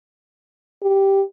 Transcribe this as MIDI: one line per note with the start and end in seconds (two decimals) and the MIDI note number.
0.83 1.22 67